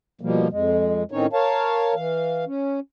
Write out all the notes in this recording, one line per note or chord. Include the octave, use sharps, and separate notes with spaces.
B2 F3 G3 A#3
F2 G#3
A2 D#3 C4 C#4 D#4 C#5
A#4 C#5 F5 A5
E3 F5
C#4